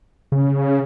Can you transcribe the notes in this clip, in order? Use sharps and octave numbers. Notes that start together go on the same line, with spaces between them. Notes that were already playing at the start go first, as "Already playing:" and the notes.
C#3